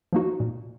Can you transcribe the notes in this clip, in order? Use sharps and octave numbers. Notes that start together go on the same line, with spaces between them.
F3 A#3 D#4 F#4
A#2